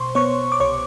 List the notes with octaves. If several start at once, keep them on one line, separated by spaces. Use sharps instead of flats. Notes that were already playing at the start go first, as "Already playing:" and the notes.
Already playing: B2 C5 C6 C#6
B3 C#5 C#6
D6
C2 C#5 C#6